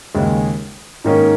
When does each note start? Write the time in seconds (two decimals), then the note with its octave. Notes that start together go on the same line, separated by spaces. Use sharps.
0.14 D#2 C#3 G#3
1.04 G#2 D#3 A#3 C#4